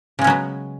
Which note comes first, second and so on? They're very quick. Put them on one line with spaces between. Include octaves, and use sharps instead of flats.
C#3 G#3 C#4 F#3 B3